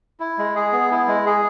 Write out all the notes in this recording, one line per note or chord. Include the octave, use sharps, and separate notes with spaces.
E4
G#3
G#4
B3
E4
G#3
G#4